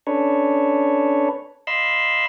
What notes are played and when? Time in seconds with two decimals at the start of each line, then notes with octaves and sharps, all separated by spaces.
0.07 C#4 D4 A4 B4 C#5
1.67 D#5 F5 B5 C6 E6